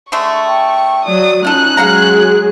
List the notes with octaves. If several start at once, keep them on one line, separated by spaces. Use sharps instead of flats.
D3 G#3 A3 C#6
G5
F#3 D5 D#6
C#4 D#4 F4 A4 F#6
F#3 G#3 G#4 F5 F#5 A#5